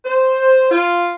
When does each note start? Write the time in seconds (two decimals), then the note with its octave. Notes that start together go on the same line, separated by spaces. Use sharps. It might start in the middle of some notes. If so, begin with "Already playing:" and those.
0.04 C5
0.71 F4